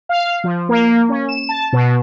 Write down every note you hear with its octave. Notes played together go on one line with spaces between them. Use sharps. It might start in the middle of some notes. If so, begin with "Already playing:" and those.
F5
F3
A#3
C#4
E7
A5
B2